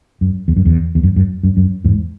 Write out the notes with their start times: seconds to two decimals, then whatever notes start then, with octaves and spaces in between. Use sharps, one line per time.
0.21 F#2
0.48 E2
0.57 F#2
0.65 E2
0.95 E2
1.03 F#2
1.16 F#2
1.43 F#2
1.57 F#2
1.84 E2 G#2